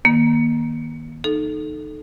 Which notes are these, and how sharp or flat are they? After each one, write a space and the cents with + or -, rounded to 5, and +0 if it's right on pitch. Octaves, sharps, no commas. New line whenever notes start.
D#3 +0 A#3 +25
D#4 -20 A4 -15